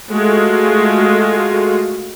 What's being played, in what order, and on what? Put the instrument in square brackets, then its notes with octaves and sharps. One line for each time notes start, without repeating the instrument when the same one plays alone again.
[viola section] G#3 A3 F4 F#4